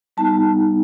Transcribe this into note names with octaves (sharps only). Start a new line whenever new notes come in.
G3 B3 D#4 A5